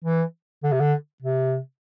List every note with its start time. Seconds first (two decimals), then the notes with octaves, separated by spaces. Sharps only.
0.04 E3
0.64 D3
0.72 C3
0.80 D3
1.22 C3